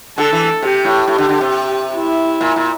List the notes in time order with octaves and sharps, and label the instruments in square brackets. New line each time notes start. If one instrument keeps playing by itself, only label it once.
[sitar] D3 [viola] A4
[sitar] E3
[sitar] C3 [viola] G4
[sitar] A2
[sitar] A2 [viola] G4
[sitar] D3
D3
C3
[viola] E4
[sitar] A#2
A#2